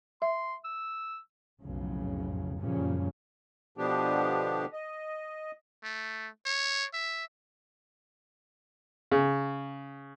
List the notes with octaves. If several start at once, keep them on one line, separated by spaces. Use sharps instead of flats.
E5 C6
E6
B1 F2 A2 C#3
F#2 A#2 C#3 F3 G3 C#4
B2 D3 F3 B3 D4 G4
D#5
A3
C#5
E5
C#3